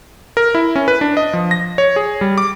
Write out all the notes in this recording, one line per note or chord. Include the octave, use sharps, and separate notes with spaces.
A#4
E4
C#4
B4
D4
D#5
F3
A#6
C#5
G#4
G3
D6